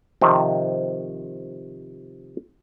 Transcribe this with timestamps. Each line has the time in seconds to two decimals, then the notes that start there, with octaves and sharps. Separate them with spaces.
0.21 C3 D#3 F3